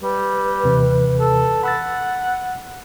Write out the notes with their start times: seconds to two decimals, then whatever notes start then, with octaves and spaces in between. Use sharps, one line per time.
0.03 G3 B4
0.64 D#2 C3 E3
1.19 A4
1.63 F#5 B5 E6 A6